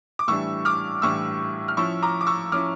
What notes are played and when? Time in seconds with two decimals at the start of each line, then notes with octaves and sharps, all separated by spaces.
0.19 D6
0.28 A2 E3 G3 D4 C#6 E6
0.65 D6 F6
1.02 A2 E3 G3 D4 C#6 E6
1.68 F6
1.77 F3 C#4 E4 C#6 E6
2.03 A#5 D6
2.21 D6
2.27 C#6 E6
2.52 F3 C#4 E4 D6 F6